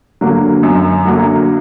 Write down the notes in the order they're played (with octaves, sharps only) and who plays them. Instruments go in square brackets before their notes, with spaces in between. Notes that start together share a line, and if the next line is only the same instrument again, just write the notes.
[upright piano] D3 F#3 A#3
F#2
D3 F#3 A#3